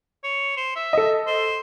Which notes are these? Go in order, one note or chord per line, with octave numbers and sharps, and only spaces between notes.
C#5
C5
E5
A4 D#5
C5